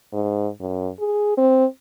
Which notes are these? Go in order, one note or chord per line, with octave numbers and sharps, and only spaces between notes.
G#2
F#2
G#4
C4